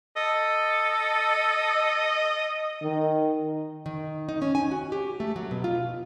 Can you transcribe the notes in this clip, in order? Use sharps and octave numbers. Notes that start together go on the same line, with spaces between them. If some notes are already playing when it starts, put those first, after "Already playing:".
A4 D#5
D#3
D#3
D#4
C#4
G#5
F#4
G4
A3
F#3
B2
F4